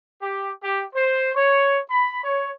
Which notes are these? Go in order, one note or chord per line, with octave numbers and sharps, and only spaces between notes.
G4
G4
C5
C#5
B5
C#5